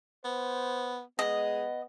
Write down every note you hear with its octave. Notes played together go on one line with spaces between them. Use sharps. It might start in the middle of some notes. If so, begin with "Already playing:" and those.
B3 C5
G#3 B3 D#5